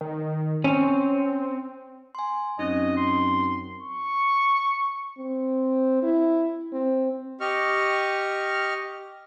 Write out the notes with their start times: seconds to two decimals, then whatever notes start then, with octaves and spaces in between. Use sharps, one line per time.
0.01 D#3
0.64 C4 C#4
2.15 G#5 C6
2.59 F#2 C4 C#4 D#4 D#5
2.97 C6
3.81 C#6
5.18 C4
6.03 E4
6.72 C4
7.41 G4 D#5 C#6 F6